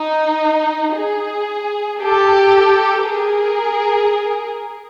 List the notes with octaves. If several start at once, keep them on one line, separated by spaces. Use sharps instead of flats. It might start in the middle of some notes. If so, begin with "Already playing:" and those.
Already playing: D#4
G#4
G4 A4
G#4 A#4